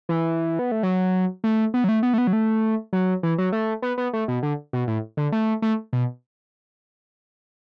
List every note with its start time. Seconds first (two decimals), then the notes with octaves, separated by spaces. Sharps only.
0.09 E3
0.59 B3
0.72 A3
0.83 F#3
1.44 A3
1.74 B3
1.84 F#3
1.89 A3
2.03 B3
2.14 A3
2.18 B3
2.27 F#3
2.33 A3
2.93 F#3
3.23 E3
3.38 F#3
3.52 A3
3.82 B3
3.98 B3
4.13 A3
4.28 B2
4.43 D3
4.73 B2
4.88 A2
5.17 D3
5.32 A3
5.62 A3
5.93 B2